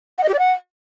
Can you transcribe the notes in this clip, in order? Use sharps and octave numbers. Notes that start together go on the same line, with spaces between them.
F#5
D#5
G4
D5
F#5